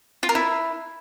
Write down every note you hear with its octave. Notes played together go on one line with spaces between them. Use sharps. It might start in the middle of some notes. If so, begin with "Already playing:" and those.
F4
A#4
E4